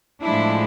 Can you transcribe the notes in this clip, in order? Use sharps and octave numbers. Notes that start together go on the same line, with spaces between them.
A2 F3 G#3 D4 E4